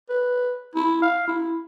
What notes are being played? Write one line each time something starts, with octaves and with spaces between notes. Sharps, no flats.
B4
E4
F5
E4